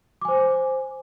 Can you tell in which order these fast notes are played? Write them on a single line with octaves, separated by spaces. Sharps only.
D6 G#5 C5